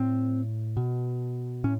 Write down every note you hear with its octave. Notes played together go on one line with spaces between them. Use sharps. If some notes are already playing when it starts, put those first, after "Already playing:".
Already playing: A2 C4
B2
A2 C#4